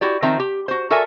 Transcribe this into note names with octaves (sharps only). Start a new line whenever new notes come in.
E4 F#4 G4 D5
D#3 F3 C4 E5 A#5
G4
F#4 C5
F#4 A4 A#4 D5 E5 G#5